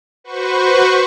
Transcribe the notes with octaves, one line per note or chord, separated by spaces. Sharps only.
F#4 B4 C5 C#6